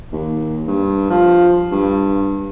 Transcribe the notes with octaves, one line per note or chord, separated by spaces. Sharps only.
D#2
G2
F3
G2